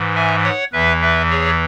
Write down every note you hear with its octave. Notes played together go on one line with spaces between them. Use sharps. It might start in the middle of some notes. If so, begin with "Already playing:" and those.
Already playing: G#2 E3
E5 G#5
C#5 F#5
E2 E3 B4 E5
B4 E5
G#4 C#5